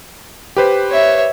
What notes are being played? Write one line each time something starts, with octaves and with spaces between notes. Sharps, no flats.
G4 B4 C5
C#5 E5